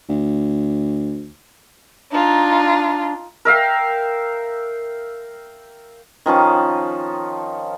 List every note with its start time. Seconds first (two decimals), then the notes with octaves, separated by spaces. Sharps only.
0.09 D2
2.11 D4 D#4 F4
3.45 A#4 E5 F5 G5
6.26 D#3 F3 C#4 A5